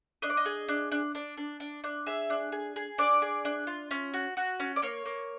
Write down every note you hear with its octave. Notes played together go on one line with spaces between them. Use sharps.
D4 D#5
D5
D#5
G#4
D4
D4
D4
D4
D4
D4
G#4 E5
D4
G#4
G#4
D4 D5
G#4
D4
F4
C#4
F#4
F#4
C#4
D5
A#3 C#5
A#3